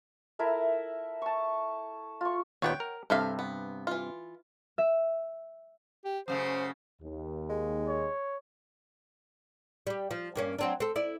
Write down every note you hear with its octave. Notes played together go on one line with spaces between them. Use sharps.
E4 A4 A#4 E5
A5 C#6
F4 C#6
D#2 A#2 B3 C#5 F#5 G5
A#4
G2 C3 A4 E5 F5
B3
E3 F4
E5
G4
F#2 C#3 A3 C5
D#2
G#3
C#5
G3 G4
F3
G2 A#3 C#4
F#3 C4 D4
C4 A4
E4 D5